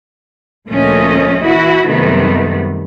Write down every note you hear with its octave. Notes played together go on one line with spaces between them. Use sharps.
D2 A#2 F3 A3 C#4 D#5
E3 E4 F#4
F#2 C3 D#3 G3 A3 B3